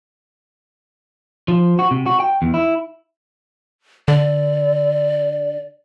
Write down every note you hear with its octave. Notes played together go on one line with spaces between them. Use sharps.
F3
F#4
C3
F#4
G5
E2
E4
D3 D5